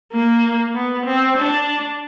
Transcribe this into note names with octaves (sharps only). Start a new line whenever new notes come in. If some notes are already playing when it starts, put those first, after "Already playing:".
A#3
B3
C4
D4